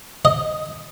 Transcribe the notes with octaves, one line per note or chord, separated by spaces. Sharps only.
D#5